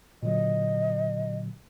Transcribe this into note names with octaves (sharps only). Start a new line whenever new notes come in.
A#2 D3 F#3 D#5